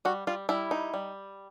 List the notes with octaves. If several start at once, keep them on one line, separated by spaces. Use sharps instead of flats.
G3 F#4
G3 F4
G3 E4
D#4
G3